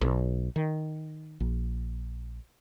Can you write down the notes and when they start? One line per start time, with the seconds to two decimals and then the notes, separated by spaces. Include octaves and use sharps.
0.01 B1
0.56 D#3
1.40 A#1